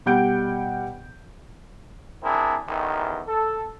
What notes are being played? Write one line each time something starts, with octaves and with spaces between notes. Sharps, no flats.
B2 G3 F#5 G6 D7
C4 D4 E4 G#4 A#4
A1 E2 D#3
A4